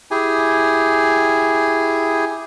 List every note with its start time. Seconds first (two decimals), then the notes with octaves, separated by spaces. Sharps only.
0.11 E4 G4 G#4 G#5